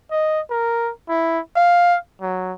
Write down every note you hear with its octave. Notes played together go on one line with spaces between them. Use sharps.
D#5
A#4
E4
F5
F#3